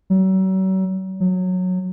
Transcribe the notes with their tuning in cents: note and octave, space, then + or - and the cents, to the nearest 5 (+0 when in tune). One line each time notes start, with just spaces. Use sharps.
F#3 +40
F#3 -15